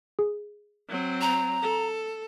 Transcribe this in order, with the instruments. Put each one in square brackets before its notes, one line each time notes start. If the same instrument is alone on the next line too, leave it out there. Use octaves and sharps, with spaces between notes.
[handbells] G#4
[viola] F#3 C4
[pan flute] A#5
[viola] A4